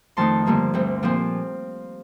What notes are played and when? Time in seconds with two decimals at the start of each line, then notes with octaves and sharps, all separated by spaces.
0.17 F2 D#3 A3 D#4 A5 C6
0.46 G2 D3 F3 A#3 D#4
0.74 D2 D3 G3 C4
1.03 A#2 F3 C4